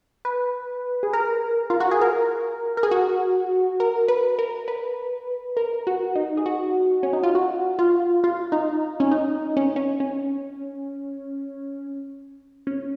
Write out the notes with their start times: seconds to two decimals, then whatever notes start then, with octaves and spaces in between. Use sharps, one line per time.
0.25 B4
1.03 G#4
1.13 A#4
1.70 F4
1.80 F#4
1.91 G#4
2.01 A#4
2.77 A#4
2.83 G#4
2.91 F#4
3.80 A#4
4.08 B4
4.39 A#4
4.68 B4
5.57 A#4
5.87 F#4
6.15 D#4
6.37 G#4
6.46 F#4
7.03 C#4
7.13 D#4
7.23 F4
7.35 F#4
7.79 F4
8.24 F4
8.52 D#4
9.00 C#4
9.11 D#4
9.57 C#4
9.76 C#4
10.00 C#4
12.67 C#4